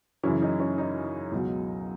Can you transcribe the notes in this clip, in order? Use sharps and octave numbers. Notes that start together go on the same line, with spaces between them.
F#2 C#3 E3 C#4 E4
D#4
C#4
D#4
C#2 B2 F#3